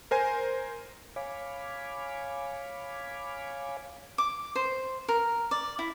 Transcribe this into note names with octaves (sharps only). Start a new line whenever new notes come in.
A#4 C5 G#5
C#5 F5 G#5 B5 D6
D6
C5
A#4
D5
E4